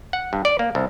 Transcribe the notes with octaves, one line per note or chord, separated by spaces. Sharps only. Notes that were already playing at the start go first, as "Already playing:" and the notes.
F#5
G2
D5
A#3
C2